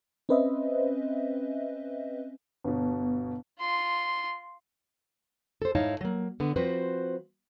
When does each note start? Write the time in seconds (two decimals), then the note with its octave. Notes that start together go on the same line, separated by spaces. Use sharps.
0.29 C4 C#4 B4 C5 D#5 E5
2.64 G1 B2
3.59 F4 C6
5.62 A4 C5
5.75 G#2 D#4 E4 C#5 F5 A5
6.01 F#3 A#3
6.40 D3 B3
6.56 F3 C4 F#4 B4 C5